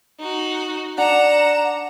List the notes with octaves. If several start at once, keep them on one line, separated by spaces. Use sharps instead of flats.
D#4 F#4
D4 F#5 A#5 E7